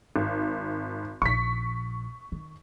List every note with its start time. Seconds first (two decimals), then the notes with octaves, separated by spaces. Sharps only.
0.16 G#1
1.22 A#1 C#6 B6
2.32 D#3